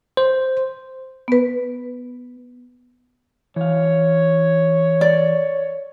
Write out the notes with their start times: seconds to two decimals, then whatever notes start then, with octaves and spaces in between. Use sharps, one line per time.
0.17 C5
1.28 B3 B4
3.56 E3 C#5 F5
5.01 D5